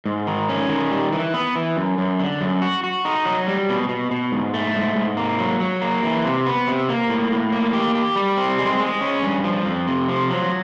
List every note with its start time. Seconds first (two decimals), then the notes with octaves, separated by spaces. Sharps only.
0.06 G#2
0.27 D#3
0.49 C#4
0.69 D#3
0.91 G3
1.13 E3
1.34 B3
1.56 E3
1.77 F#2
1.98 F#2
2.20 D3
2.41 F#2
2.62 F#4
2.84 F#4
3.05 D#4
3.25 F#3
3.47 G3
3.69 B2
3.89 B2
4.11 B2
4.32 G#2
4.54 A3
4.75 G#2
4.96 G#2
5.17 A#3
5.38 F#3
5.60 F#3
5.82 A#3
6.04 E3
6.25 C3
6.46 B3
6.68 C3
6.89 A#3
7.10 A2
7.31 A2
7.53 A#3
7.73 G4
7.95 G4
8.16 G3
8.37 C4
8.58 G#3
8.80 G#3
9.01 C#4
9.23 G2
9.44 F3
9.65 F2
9.87 C3
10.08 F3
10.30 F#3